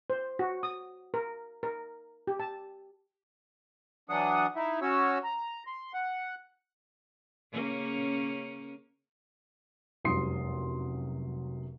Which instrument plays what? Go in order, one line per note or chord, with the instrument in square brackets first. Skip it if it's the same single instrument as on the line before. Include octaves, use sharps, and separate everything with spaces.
[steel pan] C5
F#4
D#6
A#4
A#4
G4
A5
[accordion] E3 F#3 D4 F#5 D#6
D#4 E4 E5
C#4 F#4 C#5 E6
A#5
C6
F#5
[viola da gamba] C#3 A#3 C#4
[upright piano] F1 C2 F#2 C6 D#6 C7